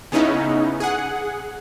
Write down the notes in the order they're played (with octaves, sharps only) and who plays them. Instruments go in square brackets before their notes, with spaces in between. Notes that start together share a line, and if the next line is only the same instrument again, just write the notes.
[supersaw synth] C#3 B3 C#4 D#4 E4
G#4 F#5